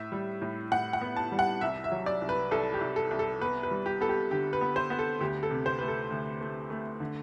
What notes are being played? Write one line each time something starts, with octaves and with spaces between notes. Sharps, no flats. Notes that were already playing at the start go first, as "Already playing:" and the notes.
Already playing: A2 E5
G3
A2
A2 F#5
F#5
B3
A5
G3
F#5
C2 E5
E5
F#3
D5
C2
B4
C2 A4
G4
C2
A4
C2
A4
B3 B4
B4
G3
G4
B3 A4
G4
D3 G4
B4
B3
C5
B3
A4
D2 G4
A4
C3
C5
A3 B4
A4
D2
A3
A3
D3